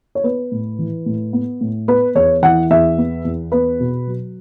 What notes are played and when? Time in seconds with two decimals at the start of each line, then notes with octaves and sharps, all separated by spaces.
0.15 C#5
0.24 B3 B4
0.52 A2
0.79 E3
1.06 A2
1.33 B3
1.61 A2
1.88 B3 B4
2.15 E2 C#5
2.42 E3 F#5
2.70 E2 E5
2.98 B3
3.25 E2
3.52 B3 B4
3.80 B2
4.07 F#3